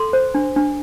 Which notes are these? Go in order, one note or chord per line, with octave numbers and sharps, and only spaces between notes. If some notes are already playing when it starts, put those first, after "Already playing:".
Already playing: A4 C6
C5
D4
D4